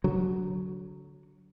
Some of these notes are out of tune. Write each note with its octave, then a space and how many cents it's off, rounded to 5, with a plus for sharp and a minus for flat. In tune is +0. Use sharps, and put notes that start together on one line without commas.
D3 -25 F#3 +0